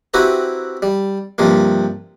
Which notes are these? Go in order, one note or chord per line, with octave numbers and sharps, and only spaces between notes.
C4 E4 F#4 G4 B4 A#5
G3
G2 C3 F3 A#3